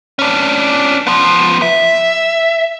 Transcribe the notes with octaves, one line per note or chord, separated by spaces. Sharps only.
C#4 D4
F3 B3
E5